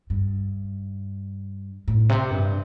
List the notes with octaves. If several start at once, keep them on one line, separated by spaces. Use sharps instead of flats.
G2
A2
C3
G2